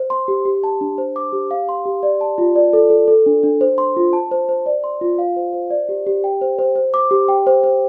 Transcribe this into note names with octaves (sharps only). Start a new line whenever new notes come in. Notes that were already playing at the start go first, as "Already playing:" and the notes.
Already playing: C5
C6
G4
G4
A5
D4
C5
D6
G4
F5
C6
G4
D5
A5
F4
D5
A4
A4
A4
D4
D4
C5
C6
F4
A5
C5
C5
D5
C6
F4
F5
C5
C5
D5
G4
G4
G5
C5
C5
C5
D6
G4
G5
C5
C5